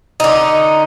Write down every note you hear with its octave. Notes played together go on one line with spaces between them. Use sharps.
D3 D#4